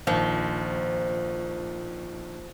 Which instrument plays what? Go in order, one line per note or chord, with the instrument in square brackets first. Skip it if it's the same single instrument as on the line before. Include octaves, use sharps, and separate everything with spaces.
[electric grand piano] A#1 D#3 [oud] F3